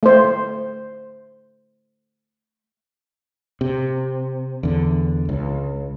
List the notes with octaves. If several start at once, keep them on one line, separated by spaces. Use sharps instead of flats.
A3 C5
C3
E2 D3
C#2